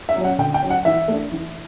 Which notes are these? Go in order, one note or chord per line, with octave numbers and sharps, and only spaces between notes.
E5
F#3
C#4 F#5
D3 G5
G5
F#3 C#4
F#5
E3 E5
A3 D4
E3